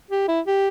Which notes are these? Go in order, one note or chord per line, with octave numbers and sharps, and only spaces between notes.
G4
E4
G4